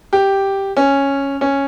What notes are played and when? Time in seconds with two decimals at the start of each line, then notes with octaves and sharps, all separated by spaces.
0.13 G4
0.77 C#4
1.41 C#4